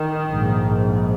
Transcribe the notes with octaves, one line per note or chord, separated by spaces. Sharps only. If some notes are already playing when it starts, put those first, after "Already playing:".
Already playing: D#3
A#1 G#2